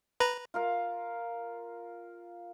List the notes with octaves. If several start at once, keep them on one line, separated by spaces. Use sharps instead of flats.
B4 A#5
F4 A#4 F5